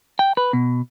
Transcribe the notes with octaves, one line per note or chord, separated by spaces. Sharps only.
G5
B4
B2